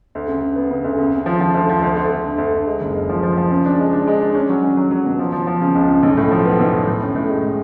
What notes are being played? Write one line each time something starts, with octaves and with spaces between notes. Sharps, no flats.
D2
C#3
C#3
B3
C#3
D2
C#3
C#3
F3
F3
D2
F3
D2
D2
D2
D3
D2
D2
G#3
F#1
G#3
F3
F3
F3
C#3
D4
G#3
D4
G#3
D4
C#4
F#3
C#4
F#3
F#3
B2
F3
F3
F3
C#3
C#2
C#3
B1
A2
F3
B3
B1
B1
A2
C#4
A2
G#3
A2